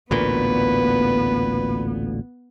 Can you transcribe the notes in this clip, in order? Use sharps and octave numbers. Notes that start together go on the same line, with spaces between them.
A1 D2 A#2 B3 B4